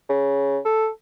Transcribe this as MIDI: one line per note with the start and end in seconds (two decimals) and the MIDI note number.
0.09 0.58 49
0.65 0.88 69